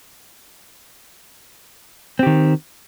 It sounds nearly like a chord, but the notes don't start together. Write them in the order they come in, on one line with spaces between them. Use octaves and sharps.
C4 G4 D#3